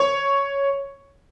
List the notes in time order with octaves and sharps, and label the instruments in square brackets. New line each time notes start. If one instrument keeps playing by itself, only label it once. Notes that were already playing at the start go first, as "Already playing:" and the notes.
Already playing: [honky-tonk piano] C#5